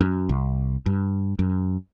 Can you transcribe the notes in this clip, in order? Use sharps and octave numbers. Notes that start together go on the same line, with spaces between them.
F#2
C2
G2
F#2